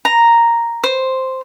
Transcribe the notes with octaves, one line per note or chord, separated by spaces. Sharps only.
A#5
C5